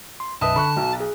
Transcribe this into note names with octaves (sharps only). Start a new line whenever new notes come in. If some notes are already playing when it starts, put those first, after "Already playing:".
C6
B1 F#2 B4 D#5 E5 A5 D#6
D3 B5 C#6 F#6
B1 F#4
G#4